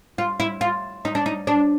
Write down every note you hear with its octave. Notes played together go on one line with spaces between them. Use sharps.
F4
E4
F4
D#4
D4
D#4
D4